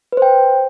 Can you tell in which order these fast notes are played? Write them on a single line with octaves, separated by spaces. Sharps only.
B4 C5 G5